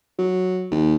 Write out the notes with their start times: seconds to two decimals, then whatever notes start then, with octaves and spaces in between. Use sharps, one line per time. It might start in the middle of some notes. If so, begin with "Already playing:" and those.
0.19 F#3
0.71 D#2